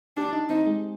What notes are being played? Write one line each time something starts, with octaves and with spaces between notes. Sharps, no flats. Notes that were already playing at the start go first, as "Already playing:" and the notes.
D4 G4
D#4
C4 D#4
G#3